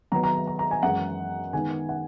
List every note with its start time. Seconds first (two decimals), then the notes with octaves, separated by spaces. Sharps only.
0.12 D#3 F#3 B3 D#4 A#5
0.24 A#5
0.35 A#5
0.47 A#5
0.59 A#5
0.71 G#5
0.83 F#2 E3 G#3 F#5
1.53 D#3 G#3 B3 D#4 G#5
1.89 F#5